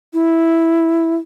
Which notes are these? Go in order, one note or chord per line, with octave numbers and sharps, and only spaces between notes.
E4